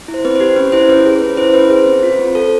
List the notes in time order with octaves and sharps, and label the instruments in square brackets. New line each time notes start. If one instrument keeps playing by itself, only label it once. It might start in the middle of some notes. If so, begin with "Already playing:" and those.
[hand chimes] E4
C5
C4 B4
G4 C5
C#4 B4
E4 C5
C#4 B4
G#4
C#4 B4
E4 C5
C#4 B4
G#4 C5
C4
F4
C4
A4